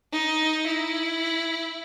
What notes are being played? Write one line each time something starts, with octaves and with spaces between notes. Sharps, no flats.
D#4
E4